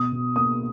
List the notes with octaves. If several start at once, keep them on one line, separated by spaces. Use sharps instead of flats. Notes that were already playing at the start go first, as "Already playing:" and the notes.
Already playing: B2 D#6
B2
A#3 D#6